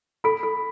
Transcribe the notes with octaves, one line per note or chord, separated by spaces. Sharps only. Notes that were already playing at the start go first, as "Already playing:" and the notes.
A4 B5
A4